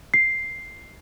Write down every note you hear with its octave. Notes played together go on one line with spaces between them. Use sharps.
C7